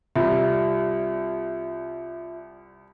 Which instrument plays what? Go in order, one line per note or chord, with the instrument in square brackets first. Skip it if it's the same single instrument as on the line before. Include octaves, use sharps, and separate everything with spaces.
[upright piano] C2 G3 [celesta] F4 E5